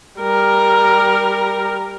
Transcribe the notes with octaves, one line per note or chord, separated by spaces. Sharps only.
G3 A#4